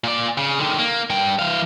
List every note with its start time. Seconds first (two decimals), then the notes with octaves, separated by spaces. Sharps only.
0.04 A#2 D5
0.38 C#3
0.59 D3 D#3
0.79 A#3
1.10 G2 G5
1.39 E3 F5